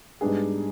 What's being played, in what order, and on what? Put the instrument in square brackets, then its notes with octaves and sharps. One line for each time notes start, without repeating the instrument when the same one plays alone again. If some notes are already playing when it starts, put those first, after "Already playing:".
[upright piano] G#2 G3 B3 D4 G#4